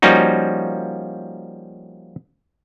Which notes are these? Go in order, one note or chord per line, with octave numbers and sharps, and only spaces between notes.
F3 G3 A#3 C#4 D#4 F#4